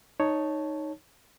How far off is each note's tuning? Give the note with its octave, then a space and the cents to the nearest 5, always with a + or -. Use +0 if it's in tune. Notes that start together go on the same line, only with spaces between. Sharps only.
D#4 -5 C#5 +0 A5 -5